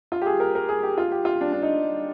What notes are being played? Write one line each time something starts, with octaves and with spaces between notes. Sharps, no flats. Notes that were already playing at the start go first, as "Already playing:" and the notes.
F4
G4
G#4
A#4
A#4
G#4
G4
F4
G4
F4
D4
D4
D#4